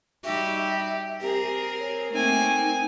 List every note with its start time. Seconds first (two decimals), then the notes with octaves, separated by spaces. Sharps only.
0.24 G3 D#4 F#4 G4 E5
1.21 C4 G4 G#4 A#4
1.79 C#5
2.13 A3 A#3 C4 D#4 G#5